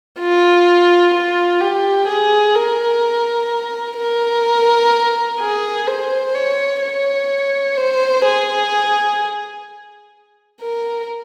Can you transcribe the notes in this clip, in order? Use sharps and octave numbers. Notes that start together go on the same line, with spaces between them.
F4
F4
G4
G#4
A#4
A#4
G#4
C5
C#5
C#5
C5
G#4
A#4